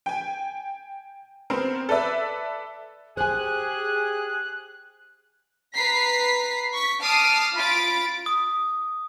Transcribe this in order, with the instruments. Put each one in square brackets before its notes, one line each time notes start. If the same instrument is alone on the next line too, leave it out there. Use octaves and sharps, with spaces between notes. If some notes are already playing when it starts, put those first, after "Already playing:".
[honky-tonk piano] G5 G#5
B3 C4 A#4 C5
A4 B4 D5 E5
[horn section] G4 G#4 [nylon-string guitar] C5 G#5 [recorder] F#6
[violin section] B4 A#5 B6 C7
C#6 B6
A5 D6 D#6 F6 C7
F4 B5 A6 D7
[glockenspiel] D#6